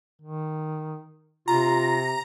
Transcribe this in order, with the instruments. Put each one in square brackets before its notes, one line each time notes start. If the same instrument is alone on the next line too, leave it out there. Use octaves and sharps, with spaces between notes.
[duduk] D#3
[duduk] C3 [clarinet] F4 [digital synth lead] A#5